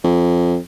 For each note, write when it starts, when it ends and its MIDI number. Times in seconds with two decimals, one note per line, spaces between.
0.04 0.57 41